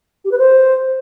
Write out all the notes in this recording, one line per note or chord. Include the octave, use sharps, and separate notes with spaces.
G4
B4
C5